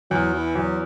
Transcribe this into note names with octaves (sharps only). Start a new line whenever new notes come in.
E2 F#3
E3
E2 F#3